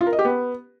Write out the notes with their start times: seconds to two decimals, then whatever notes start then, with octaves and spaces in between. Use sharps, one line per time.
0.01 F4
0.07 A#4
0.13 D#5
0.19 G4
0.25 B3